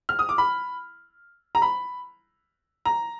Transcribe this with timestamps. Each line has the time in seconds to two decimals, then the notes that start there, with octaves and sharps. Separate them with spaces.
0.09 F6
0.19 D#6
0.29 D6
0.38 B5
1.55 A#5
1.62 B5
2.85 A#5